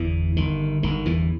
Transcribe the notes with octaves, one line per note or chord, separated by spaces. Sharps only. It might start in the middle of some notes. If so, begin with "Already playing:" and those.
Already playing: G1 E2 E3
G1 D#3
G1 D#3
E2 E3